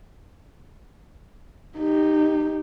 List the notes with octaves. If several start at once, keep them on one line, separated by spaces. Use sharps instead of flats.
D#4 G4